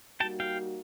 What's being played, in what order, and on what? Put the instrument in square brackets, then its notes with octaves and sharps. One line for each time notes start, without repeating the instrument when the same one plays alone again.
[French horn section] G3 A#3 D#4 F#4 [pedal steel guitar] G5 A5
[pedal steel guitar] F5 G5